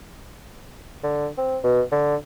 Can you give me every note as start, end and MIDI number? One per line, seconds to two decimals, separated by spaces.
1.04 1.28 50
1.38 1.58 60
1.64 1.82 47
1.92 2.16 50